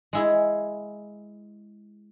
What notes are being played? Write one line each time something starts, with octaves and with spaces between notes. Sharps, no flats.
G#3 E4 G#4